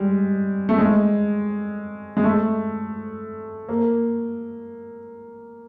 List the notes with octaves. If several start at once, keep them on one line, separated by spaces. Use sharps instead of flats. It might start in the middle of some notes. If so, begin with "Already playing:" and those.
Already playing: G3 G#3
A3
G#3
G#3
A3
A#3